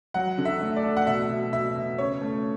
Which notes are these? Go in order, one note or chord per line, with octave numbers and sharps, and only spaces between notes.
F#3 F#5
D3
E5
A3
D5
A3
F#5
B2 E5
B2
B2 E5
B2
C#3 C#5
A3